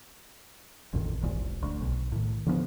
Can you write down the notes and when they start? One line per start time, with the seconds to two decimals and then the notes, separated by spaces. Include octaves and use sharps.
0.93 A1 F2 A#2 D#3
1.23 E1 A#1 E2 G#2
1.63 D2
1.81 B1
2.12 A2 D#3
2.46 D3 F3 G#3 B3